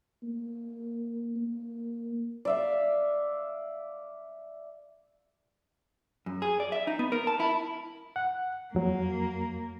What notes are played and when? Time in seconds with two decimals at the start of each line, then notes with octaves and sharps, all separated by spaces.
0.23 A#3
1.36 A#3
2.45 D5 E5 F5
6.26 F#2
6.42 G#4
6.60 D5
6.72 E5
6.87 D#4
6.99 B3
7.12 A#4
7.27 A5
7.40 E4
8.16 F#5
8.75 F2 F#3 A#3